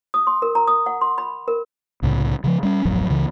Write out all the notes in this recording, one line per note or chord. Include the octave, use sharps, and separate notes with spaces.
D#6
C6
A#4
A#5
D#6
F#5
C6
B5
A#4
C2 A2 C#3
C#3 E3 F3
G3 C#4
D1 A1 F2 F#3
C#2 C#3 E3